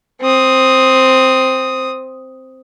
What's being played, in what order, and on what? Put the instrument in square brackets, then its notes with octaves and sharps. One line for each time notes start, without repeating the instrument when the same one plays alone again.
[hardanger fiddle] C4 D#6